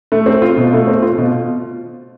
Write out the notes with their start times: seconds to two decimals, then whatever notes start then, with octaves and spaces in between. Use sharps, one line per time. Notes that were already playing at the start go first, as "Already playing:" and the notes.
0.12 A3
0.26 C4
0.42 F4
0.57 B2
0.73 A3
0.87 C4
1.02 F4
1.18 B2